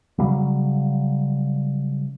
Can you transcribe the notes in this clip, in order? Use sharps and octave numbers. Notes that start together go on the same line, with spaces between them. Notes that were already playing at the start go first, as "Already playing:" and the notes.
C#3 F#3 G3